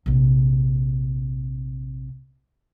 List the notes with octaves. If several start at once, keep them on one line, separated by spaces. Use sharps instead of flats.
A#1 C3